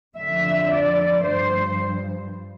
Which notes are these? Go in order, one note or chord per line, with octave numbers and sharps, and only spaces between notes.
F2 D3 F3 E5
D5
G2 F3 C5